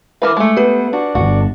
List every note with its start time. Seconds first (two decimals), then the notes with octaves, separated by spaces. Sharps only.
0.22 E3 A#4 B4 E5 D6
0.37 G#3 A3
0.57 B3 G4 B4
0.93 D4 F#4
1.15 D1 G1 F#4